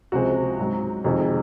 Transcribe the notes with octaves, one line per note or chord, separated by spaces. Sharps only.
C#2 C3 F3 G#3 C4 F#4
G#2 F#3 C4
F2 C3 D#3 G#3 C4 F#4
G#4